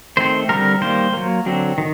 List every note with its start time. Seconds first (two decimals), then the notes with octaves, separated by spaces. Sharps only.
0.17 D#3 A3 C4 C5
0.49 D3 G3 C4 A#4
0.81 D#3 G3 A#3 C5
1.13 F#3 A#3
1.46 D3 F#3 C4
1.78 D#3